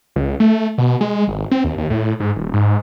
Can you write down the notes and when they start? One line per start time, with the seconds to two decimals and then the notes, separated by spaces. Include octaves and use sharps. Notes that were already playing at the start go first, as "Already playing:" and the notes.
0.16 C#2
0.40 A3
0.78 B2
1.01 G#3
1.28 G#1
1.51 C4
1.64 D#2
1.78 D#2
1.90 A2
2.20 G#2
2.36 D#1
2.53 G#2